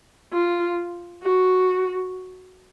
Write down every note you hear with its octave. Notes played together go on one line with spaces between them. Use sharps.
F4
F#4